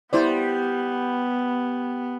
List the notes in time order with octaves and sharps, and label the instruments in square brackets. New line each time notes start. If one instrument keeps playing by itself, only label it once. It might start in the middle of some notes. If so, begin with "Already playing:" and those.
[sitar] G3 [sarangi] B3 [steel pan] E4 C5 D5